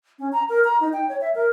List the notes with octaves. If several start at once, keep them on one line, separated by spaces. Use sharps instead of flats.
C#4
A#5
A#4
A#5
D#4
G5
C#5
E5
A#4